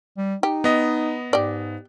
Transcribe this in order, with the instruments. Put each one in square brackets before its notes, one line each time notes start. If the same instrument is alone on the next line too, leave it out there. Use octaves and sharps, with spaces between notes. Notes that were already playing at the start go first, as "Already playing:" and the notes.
[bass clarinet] G3
[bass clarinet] D#4 [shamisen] G4
[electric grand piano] B3 D#5
[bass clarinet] G#2 [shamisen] G4 D5